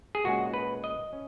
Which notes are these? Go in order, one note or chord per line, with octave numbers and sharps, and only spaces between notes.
G#4
A#2 G#3 C#4 F#4
B4
D#5
C#4